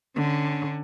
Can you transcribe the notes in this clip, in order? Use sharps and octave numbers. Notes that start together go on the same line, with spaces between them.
D3 C#4